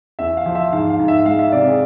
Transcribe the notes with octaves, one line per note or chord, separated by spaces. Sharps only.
E2 E5
F5
F3
E5
G#2 F5
F5
G#2
E5
G#3 F5
E5
C3 D5
G#4